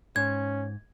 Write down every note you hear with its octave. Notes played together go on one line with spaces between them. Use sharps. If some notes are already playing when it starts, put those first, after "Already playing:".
G#2 C#4 G#6